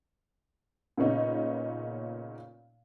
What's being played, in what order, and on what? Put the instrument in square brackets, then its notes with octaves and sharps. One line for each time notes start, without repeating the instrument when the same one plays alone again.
[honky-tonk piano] A#2 C#3 B3 C#4 D#4